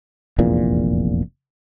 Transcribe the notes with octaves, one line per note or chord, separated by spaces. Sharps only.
F1 A#1 E2 A#2